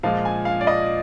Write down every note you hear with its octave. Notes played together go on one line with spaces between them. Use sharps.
A#2 F3 G#3 F5
G#5
F5
D5
D#5